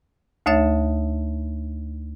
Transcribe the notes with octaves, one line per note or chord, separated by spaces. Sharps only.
D2 A3 D#4 C#5 E5 A6